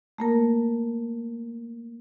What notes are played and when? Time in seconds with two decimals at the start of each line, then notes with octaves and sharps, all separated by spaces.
0.18 A3 A#3 A#4